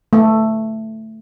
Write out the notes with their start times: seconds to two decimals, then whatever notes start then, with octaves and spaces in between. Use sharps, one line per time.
0.13 A3